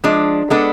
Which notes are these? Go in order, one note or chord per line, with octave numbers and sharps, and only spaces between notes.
F3 G#3 D4
G#3 B3 D4 A4